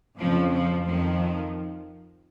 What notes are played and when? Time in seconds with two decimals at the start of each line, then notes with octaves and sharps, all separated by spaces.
0.17 F2 C#3 F3
0.51 F3
0.84 F2 D#3 F3